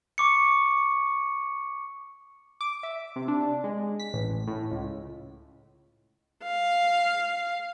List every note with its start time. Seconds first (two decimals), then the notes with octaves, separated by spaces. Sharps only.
0.18 C#6 D6 C#7
2.61 D6
2.83 E5
3.16 C3
3.28 D4
3.64 G#3
3.99 B6
4.14 A1
4.48 A2
4.71 C#2
6.44 F5